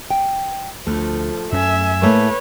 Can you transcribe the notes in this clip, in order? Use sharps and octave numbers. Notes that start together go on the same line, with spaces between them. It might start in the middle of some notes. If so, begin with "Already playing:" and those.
G5
D2 F3 A3
F#2 C#4 E5 G#5
A2 A3 A#3 B4 C#5